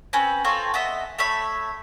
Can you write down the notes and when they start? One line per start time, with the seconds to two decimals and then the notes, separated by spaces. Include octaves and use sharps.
0.13 C4 C#4 B4
0.45 C4 F4 A4 C#5
0.74 B3 D#5 E5
1.18 A3 C#5 E5 B5